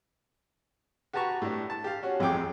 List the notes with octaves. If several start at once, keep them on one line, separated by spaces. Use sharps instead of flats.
F#4 G4 B4 A5 A#5 C#6
A2 D4
A5
G4 F5
C#4 F#4
A1 F2 G#4 G5 D6